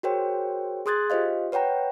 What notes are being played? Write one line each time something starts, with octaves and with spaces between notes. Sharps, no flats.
F#4 G#4 A#4 C5 C#5 G5
G#4 C6 D#6 F#6 G#6 A6
F4 G4 C5 D#5 F5
B4 C#5 F#5 G5 A#5